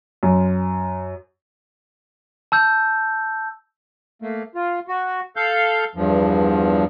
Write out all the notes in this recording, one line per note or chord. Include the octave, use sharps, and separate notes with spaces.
F#2
A5 E6 G6
A3 A#3
F4
F#4
A4 F5 G6
E2 G2 F3